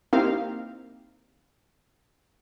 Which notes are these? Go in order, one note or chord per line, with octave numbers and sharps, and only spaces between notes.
A#3 C4 D#4 E4 G4 F5